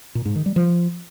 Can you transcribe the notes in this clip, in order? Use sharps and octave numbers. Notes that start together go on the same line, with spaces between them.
A#2
G#2
D#3
G3
F3